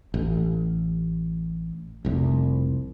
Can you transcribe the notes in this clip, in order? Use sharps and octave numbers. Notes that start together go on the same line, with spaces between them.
A1
F1 C2